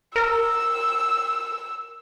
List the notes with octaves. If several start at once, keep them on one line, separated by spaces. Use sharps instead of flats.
A#4 E6